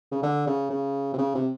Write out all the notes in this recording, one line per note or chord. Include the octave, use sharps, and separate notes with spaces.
C#3
D3
C#3
C#3
C3
C#3
C3